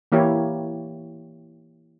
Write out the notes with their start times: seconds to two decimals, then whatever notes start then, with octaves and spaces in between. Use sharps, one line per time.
0.12 E3 A#3 E4 G4 C#5